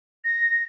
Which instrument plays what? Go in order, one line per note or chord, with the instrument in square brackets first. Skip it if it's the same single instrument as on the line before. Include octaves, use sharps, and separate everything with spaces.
[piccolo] A#6